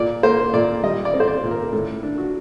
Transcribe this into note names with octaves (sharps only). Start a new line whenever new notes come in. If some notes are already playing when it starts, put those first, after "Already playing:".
Already playing: A#2 D5
A#3 C5
A#2 D5
G3 D#5
D5
C4
C5
D5
A#2
A#4
A2 A4
D4
F#4